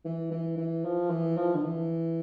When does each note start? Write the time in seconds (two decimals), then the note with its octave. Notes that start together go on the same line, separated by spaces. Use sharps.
0.05 E3
0.31 E3
0.57 E3
0.85 F3
1.10 E3
1.37 F3
1.55 D3
1.64 E3